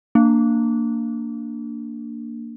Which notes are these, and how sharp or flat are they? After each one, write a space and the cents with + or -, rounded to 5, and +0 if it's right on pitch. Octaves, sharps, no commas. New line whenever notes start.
A#3 -15 D4 +0